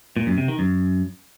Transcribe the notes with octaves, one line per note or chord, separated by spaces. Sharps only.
A#2
F#2
C3
D#3
F#2